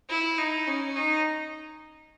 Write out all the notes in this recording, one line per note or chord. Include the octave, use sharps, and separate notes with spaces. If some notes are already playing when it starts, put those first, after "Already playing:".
E4
D#4
C#4
D#4